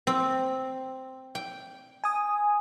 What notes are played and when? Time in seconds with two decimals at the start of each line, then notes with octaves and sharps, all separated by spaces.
0.07 C4
1.35 G5
2.04 G#5 D#6